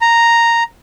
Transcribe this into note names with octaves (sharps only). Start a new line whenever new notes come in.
A#5